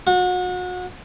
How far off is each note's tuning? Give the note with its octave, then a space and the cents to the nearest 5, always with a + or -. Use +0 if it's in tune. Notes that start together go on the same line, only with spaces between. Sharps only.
F#4 -30